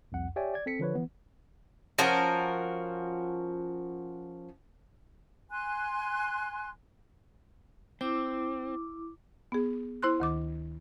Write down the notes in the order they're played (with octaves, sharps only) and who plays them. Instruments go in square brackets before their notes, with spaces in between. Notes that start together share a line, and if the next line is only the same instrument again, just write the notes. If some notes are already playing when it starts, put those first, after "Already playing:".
[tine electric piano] C2 F2 F#5
G4 C#5 D5 E5 G5 G#5
D5 G#6
C4 A4 B6 C#7
D3 F3 B4 C#5
E3 B3
[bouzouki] F3 C#4 F#4 A#4
[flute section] G#5 C6 F#6
[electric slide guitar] C4 [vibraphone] E4 D6
[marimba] B3 G#4
E4 C5 C6 F#6
D2 D#3 D6